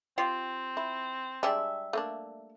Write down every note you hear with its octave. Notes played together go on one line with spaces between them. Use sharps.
C4 F4 G4
E4
G3 G#3 D4 G4 E5
A3 A#3 D4